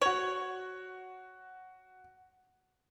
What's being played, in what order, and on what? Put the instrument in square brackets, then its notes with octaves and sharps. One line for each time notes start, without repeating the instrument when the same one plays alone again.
[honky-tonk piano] F#4 F#7 [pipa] C#5